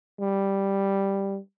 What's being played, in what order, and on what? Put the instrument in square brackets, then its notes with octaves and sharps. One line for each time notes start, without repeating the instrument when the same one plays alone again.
[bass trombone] G3